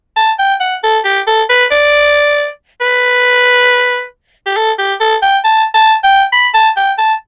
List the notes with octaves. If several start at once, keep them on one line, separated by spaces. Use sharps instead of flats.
A5
G5
F#5
A4
G4
A4
B4
D5
B4
G4
A4
G4
A4
G5
A5
A5
G5
B5
A5
G5
A5